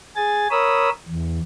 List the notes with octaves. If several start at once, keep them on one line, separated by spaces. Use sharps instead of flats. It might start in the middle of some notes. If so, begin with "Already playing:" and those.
G#4 G#5 A6
A#4 C#5 B5 D#6 E6
E2